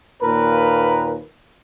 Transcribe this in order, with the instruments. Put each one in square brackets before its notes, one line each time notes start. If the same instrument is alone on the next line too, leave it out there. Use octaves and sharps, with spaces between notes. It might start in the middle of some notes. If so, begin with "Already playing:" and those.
[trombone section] D#2 A#2 A#4 B4